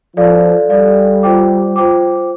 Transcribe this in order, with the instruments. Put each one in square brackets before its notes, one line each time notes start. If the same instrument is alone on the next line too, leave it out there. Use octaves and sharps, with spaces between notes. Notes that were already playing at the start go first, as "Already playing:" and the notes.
[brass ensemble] F3 [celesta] A4 D5 F5
[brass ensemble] G3 [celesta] A4 D5 F5
[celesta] F4 C5 G5 D6
F4 C5 G5 D6